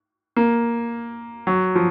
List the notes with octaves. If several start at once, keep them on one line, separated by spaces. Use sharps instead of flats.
A#3
F#3
F3